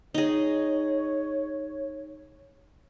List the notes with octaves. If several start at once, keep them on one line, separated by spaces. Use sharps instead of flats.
D#4 G#4 C#5